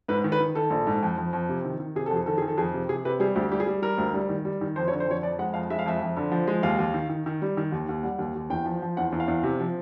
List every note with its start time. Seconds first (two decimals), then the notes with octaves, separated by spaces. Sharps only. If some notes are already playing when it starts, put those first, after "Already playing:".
0.08 G#2 B4
0.24 D#3
0.32 B4
0.40 D#3
0.55 D#3 A4
0.70 A#1
0.87 G#2
1.03 F2
1.18 F2
1.33 F2
1.49 C3
1.65 D#3
1.80 D#3
1.96 C3 G#4
2.06 F2 A4
2.16 G#4
2.26 D#3 A4
2.38 D#3 G#4
2.48 A4
2.57 F2 G#4
2.74 C3
2.89 C3 G#4
3.05 C3 B4
3.20 G3 G#4
3.35 D2 G4
3.51 G3 G4
3.60 G#4
3.67 G3
3.82 G3 A#4
3.98 D2
4.14 G3
4.29 D#3
4.45 G3
4.61 D#3
4.76 F2 C5
4.88 C#5
4.91 D3
5.00 C5
5.08 F2 C#5
5.23 F2 D5
5.39 G#3 F#5
5.54 F2 F5
5.70 G#3 E5
5.79 F5
5.86 F2 E5
6.01 F2
6.17 D3
6.32 F3
6.48 G#3
6.63 D#2 F5
6.79 D#2
6.94 D#3
7.10 D#3
7.26 D#3
7.42 G3
7.57 D#3
7.72 D#2
7.89 D#2
8.03 G3 F#5
8.19 D#2
8.35 D#2
8.50 E2 G5
8.66 F3
8.82 F3
8.97 E2 F#5
9.12 E2
9.20 F5
9.28 E2
9.43 C3
9.60 F3